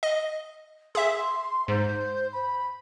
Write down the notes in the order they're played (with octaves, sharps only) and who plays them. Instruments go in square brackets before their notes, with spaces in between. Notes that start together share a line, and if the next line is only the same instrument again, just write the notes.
[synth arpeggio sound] D#5
[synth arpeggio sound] G#4 E5 [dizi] C6
[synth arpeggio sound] G#2 [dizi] C5
[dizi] B5